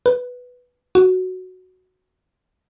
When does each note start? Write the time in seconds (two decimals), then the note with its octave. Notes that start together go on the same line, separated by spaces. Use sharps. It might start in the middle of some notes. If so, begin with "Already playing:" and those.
0.06 B4
0.95 F#4